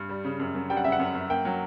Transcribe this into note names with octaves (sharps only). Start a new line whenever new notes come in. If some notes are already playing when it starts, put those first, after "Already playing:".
Already playing: G2
G3
C#3
F#2
F#2
G3 G5
F#5
C#3 E5
F#5
F#2
F#2
A#3 G5
F#3